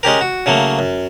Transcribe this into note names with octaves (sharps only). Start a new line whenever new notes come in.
G#3 C#4 G4 A#4
F#4
C#3 F#3 A3 A#3
F#2